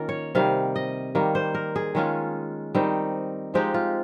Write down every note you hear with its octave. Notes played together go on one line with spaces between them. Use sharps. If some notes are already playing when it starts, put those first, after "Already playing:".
Already playing: D#3 A#3 C#4 F4 A#4
C#5
C3 D#3 G3 F5
D#5
D#3 G3 A#3
C5
A#4
G#4
D#3 G#3 C#4 F4
D#3 G3 C4 D#4
F3 G#3 C4 D#4 G4
F4